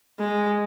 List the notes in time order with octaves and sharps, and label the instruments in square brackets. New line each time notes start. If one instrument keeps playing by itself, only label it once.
[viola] G#3